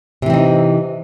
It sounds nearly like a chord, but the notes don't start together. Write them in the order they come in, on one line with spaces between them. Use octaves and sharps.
C3 E3 C4 D#4